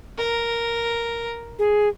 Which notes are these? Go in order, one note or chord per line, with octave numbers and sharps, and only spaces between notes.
A#4
G#4